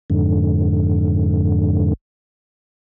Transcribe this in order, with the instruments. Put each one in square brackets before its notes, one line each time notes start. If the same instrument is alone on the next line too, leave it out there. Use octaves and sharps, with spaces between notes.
[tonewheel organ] F2 G#2 D3